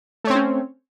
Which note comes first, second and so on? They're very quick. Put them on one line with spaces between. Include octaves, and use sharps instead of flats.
A3 C#5 C4 C5 C#4